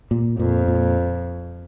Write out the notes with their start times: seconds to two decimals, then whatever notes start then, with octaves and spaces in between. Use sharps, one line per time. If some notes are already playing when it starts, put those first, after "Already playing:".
0.11 A#2
0.39 F2 A#2
0.68 A#2